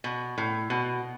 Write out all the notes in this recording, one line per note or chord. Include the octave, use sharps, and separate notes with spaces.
B2
A2
B2